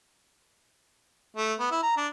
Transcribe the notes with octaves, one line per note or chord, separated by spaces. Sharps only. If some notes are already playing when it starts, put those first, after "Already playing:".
A3
B3
E4
A#5
D4